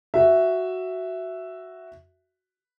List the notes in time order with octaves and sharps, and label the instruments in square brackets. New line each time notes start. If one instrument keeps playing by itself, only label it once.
[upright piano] F#4 E5